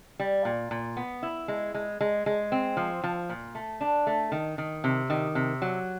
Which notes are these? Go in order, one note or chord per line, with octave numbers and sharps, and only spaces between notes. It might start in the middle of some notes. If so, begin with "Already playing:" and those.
G3
A#2
A#2
B3
E4
G#3
G#3
G#3
G#3
C4
F3
F3
A#2
A3
D4
A3
D#3
D#3
C3
D#3
C3
F#3